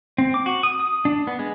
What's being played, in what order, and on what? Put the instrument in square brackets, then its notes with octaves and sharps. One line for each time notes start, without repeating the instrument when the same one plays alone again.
[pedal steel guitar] C4
D6
F#4
D#6
D#6
D4
B3
G#3